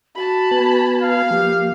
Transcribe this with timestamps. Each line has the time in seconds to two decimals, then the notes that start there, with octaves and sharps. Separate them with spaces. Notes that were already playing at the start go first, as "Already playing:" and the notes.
0.16 F#4 A5 B5
0.51 B3 B4 G#5
1.02 F5
1.31 F3 A#3 G4